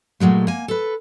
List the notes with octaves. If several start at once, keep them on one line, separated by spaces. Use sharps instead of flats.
A#2 F#3 G#3 A3
A#3 G#5
A4 B4